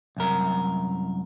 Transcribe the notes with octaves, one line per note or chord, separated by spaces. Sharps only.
C2 F#2 A#4